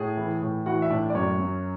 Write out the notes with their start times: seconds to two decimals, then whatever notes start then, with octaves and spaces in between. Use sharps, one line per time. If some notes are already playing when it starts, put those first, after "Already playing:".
Already playing: A2 G#4
0.17 E3
0.42 A2
0.66 E3 F#4 F#5
0.82 E5
0.90 A2 D4 D5
1.10 D5
1.15 F#2 C#4 C#5
1.39 F#3